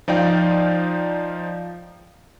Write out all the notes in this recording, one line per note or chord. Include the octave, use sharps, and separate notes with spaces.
F3 D#4 D5 F5 G5